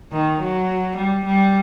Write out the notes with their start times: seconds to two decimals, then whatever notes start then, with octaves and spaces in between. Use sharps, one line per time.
0.12 D#3
0.40 F#3
0.97 G3
1.25 G3